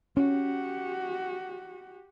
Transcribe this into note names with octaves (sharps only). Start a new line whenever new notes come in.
C#4 F#4 G4